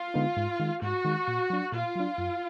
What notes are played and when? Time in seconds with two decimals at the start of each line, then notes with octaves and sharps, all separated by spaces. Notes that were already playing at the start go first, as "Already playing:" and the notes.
Already playing: F4
0.14 D3 G#3 B3 D#4
0.37 G#2
0.60 D#3 G#3
0.82 G#2 F#4
1.05 D#3 G#3
1.28 A#2
1.50 F#3 D4
1.72 A#2 F4
1.96 F#3 D4
2.18 F#2